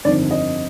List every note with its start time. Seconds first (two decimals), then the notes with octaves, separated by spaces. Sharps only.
0.05 G1 F2 D#3 D5
0.31 D#5